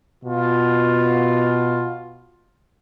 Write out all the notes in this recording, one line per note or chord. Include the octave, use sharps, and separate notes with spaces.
B2 F4